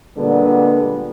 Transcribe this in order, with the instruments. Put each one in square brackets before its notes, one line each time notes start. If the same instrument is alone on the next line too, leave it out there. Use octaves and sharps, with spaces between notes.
[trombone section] A#2 D3 G3 G#3 B3